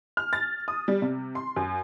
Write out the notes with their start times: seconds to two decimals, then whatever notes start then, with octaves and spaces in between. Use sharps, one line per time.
0.17 F6
0.33 A6
0.68 D#6
0.88 G3
1.02 C3
1.35 C6
1.56 F#2